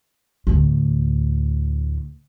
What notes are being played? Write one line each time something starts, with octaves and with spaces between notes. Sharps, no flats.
D2 A2